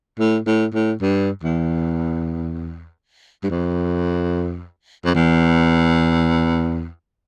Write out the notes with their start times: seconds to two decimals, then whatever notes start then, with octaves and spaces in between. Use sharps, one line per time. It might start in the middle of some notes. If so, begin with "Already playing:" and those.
0.19 A2
0.47 A2
0.74 A2
1.01 G2
1.43 E2
3.43 G2
3.50 F2
5.05 F2
5.15 E2